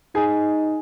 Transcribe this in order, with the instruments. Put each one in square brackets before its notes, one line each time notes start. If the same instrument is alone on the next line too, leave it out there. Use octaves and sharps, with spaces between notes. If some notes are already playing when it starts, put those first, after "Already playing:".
[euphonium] D#4 [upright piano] G#4 G#5